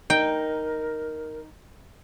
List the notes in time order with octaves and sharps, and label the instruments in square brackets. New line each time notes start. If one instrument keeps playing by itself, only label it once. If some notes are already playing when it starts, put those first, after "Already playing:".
[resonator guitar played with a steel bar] D#4 [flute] A#4 [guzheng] G5